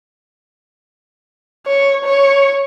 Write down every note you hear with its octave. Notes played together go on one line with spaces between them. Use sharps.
C#5
C#5